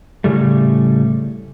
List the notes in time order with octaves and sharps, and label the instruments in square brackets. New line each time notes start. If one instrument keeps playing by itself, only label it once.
[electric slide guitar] A2 C#3 G3 A3